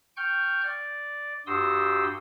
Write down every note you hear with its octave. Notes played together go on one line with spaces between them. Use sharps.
G5 C#6 F6 G6
D5
G2 F#4 G4 C6 D#6 E6